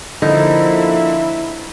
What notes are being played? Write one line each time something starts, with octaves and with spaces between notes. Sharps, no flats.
D3 F3 A#3 D#4 E4